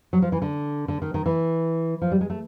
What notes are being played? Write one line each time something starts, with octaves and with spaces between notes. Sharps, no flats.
F#3
F3
E3
D3
D3
D#3
D#3
E3
F3
G3
G#3
A3